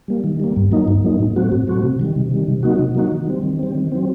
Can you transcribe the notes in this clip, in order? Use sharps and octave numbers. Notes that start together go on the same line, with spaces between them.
G3 A#3
D#3
G3 A#3
G2
F#3 A#3 D#4
G2
F#3 A#3 D#4
A2
F#3 A3 C4 F#4
A2
F#3 A3 C4 F#4
C3
D#3 G3
C3
D#3 G3
C3
F#3 A#3 D#4 F#4
C3
F#3 A#3 D#4 F#4
D#3
G3 C4
D#3
G3 C4
D#3
F#3 C4